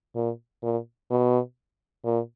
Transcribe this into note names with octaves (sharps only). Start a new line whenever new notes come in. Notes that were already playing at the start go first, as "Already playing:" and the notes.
A#2
A#2
B2
A#2